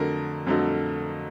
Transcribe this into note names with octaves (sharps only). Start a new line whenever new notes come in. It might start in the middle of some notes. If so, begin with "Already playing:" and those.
Already playing: F2 D3 F#3 A3 A#4
F2 D3 F#3 A3